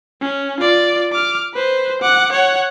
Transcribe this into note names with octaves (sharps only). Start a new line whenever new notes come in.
C#4
F4 D5
D6 F6
B4 C5
F#5 D6
C#5 F#5